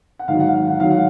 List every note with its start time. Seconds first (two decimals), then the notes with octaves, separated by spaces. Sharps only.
0.19 F#5
0.28 G#2 D#3 F#3 F5
0.40 F#5
0.54 F5
0.67 F#5
0.80 G#2 D#3 F#3 F5
0.91 F#5